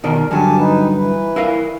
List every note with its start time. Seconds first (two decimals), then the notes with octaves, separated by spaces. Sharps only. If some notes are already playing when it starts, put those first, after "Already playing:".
0.04 B2 D#3 A#4 D5
0.31 G2 D3 F#3 G4 G#5 A5
0.58 D#4 B4
0.95 E3 B4
1.36 E4 A#4 F5